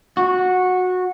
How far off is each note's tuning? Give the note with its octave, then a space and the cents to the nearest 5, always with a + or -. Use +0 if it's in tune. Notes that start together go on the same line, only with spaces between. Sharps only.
F#4 -15